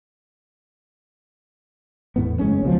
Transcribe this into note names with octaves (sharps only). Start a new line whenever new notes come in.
E2 A2 B3
F#1 G#3 C#4
C#2 B2 D3 F3